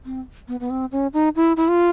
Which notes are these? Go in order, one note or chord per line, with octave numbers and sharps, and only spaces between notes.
C4
B3
B3
C4
C#4
D#4
E4
E4
F4